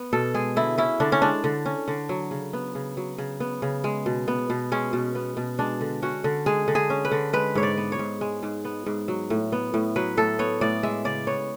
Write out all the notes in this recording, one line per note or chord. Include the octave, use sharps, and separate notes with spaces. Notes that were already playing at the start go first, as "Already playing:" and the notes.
Already playing: B3
B2 A4
G#3 G#4
D3 E4
C#4 E4
D3 D4
C#4
G#3 D4
D3
C#4
D3
F#3
C#3
B3
C#3
F#3
C#3
B3
C#3
G#3
B2
B3
B2
G#3 C#4
B2
B3
B2
G#3 D4
D3
C#4 F#4
D3
G#3 G#4
D3
G#4
C#4
B4
D3
G#3 B4
G#2 C#5
D5
B3
C#5
G#2
G#3
G#2
B3
G#2
F#3
A2
B3
A2
F#3 B4
A2 A4
B3 C#5
A2 D5
G#3 E5
C#3 D5
B3 C#5